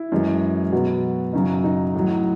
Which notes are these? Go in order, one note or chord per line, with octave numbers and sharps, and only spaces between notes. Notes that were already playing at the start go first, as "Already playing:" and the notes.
Already playing: E4
F#2 E3 G#3
B2 F#3 F#4
F#2 C#3 F#3 D#4
D#4
A2 F#3